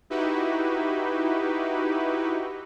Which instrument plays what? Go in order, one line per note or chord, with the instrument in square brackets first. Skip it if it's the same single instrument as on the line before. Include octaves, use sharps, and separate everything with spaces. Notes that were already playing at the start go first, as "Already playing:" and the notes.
[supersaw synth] D#4 E4 F#4 G4 B4